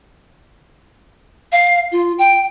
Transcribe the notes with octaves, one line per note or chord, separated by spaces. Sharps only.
F5
F4
G5